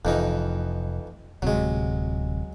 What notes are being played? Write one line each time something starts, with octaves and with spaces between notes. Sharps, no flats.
F1 F2 E3 D#4
D1 C3 F#3 G#3